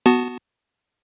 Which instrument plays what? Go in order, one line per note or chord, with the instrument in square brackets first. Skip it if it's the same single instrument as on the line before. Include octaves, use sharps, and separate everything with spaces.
[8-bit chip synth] B3 F#4 A5